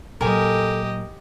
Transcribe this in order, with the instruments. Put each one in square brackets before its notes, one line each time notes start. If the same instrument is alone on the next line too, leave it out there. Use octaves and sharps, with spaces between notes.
[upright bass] A#2 F#3 [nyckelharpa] G4 D#5 [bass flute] A4 [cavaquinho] A#4 G#5